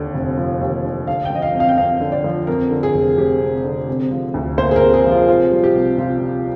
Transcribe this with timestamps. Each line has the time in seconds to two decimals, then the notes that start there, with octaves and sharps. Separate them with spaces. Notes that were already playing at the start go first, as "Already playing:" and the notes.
Already playing: D#2 D3
0.14 F1
0.38 F3
0.61 D#2
0.84 D3
1.07 D3 F5
1.25 G5
1.30 F3
1.35 D#5
1.42 F5
1.54 F2
1.60 F5
1.69 G5
1.78 F2 F5
2.01 D3
2.12 D5
2.24 F3
2.47 F2 A#4
2.71 D3
2.83 G#4
2.94 F1
3.17 F1 G4
3.41 F2
3.65 D3
3.88 C3
4.11 F3
4.34 D2
4.58 A#3 C5
4.71 G#4
4.76 A#4
4.81 C3
4.94 G#4
5.05 F3
5.11 F4
5.28 C3 F4
5.51 G3
5.64 G4
5.75 C2
5.98 C2 F4
6.21 C3